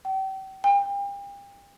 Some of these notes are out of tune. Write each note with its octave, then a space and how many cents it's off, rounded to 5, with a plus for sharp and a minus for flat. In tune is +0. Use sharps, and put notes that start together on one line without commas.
G5 -35
G5 +35